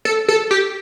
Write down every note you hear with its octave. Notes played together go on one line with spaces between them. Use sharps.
A4
A4
G4